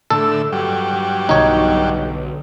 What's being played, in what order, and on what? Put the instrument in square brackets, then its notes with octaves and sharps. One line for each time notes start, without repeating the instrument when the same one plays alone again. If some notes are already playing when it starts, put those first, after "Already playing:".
[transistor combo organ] A2 D3 E6 [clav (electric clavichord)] A4
[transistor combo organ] G2 F#3 G3
[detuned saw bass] B1 [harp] D3 [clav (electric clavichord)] D#4 C#5